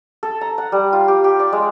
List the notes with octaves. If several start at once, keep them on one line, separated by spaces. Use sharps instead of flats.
A4
A#5
F#5
G3
F4
G4
G4
D5
G#3